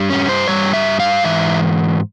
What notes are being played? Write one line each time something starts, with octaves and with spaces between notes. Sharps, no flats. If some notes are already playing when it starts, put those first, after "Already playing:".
Already playing: G2 G3
C#4
C5
G2 G3 C#5
E5
F5
G#2 E3 E5